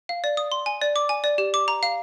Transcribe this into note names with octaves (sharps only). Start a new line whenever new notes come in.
F5
D5
D#6
C6
G#5
D5
D6
G#5
D5
G4
D6
A#5
F5